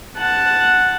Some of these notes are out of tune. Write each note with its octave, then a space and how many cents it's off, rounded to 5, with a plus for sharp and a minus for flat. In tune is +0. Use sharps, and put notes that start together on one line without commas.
F#5 +0 A5 +0